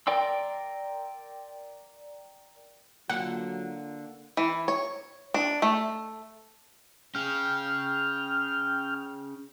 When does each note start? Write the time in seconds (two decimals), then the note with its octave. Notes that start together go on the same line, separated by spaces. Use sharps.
0.07 A#4 D5 G5 C6 E6
3.10 D3 F#3 A#3 F4 E5 F#5
4.37 E3
4.68 C#5
5.34 D4
5.62 A3
7.15 C#4 G#4 G5 F6